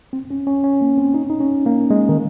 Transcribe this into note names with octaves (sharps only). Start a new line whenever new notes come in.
C4
C#4
C#4
C#4
A#3
C4
D#4
D#4
C#4
A#3
G#3
D#3